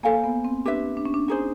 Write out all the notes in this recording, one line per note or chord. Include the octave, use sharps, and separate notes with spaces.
A#3 A4 C5 F5 G#5
B3
C4
D4 G4 B4 E5
D4
C#4
D4
D#4 G#4 C5